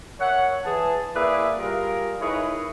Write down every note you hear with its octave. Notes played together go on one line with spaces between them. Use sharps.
A#4 C#5 E5 F#5
E3 G#4 A5
A#3 E4 G#4 B4 D5 E5
G3 F4 G#4 A#4
D#4 E4 G#4 A#4 B4 C#5